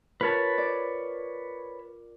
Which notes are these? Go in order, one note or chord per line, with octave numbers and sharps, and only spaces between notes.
F4 A#4 B4 C#5 A5
D5